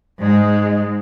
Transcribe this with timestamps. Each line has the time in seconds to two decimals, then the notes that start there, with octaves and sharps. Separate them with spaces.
0.19 G#2 G#3